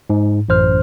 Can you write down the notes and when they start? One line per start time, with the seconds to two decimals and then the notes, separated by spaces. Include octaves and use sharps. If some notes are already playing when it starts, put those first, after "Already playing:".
0.10 G#2
0.49 A1 F#2 C5 F6